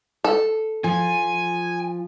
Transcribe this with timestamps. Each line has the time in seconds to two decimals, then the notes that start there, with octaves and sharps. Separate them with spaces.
0.24 A4
0.84 F3 G#5